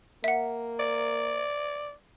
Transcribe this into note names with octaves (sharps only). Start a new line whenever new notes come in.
A#3 E5 F#5
D5